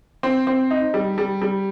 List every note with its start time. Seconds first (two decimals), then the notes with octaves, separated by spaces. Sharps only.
0.23 C4
0.47 C4
0.71 D#4
0.94 G3
1.18 G3
1.42 G3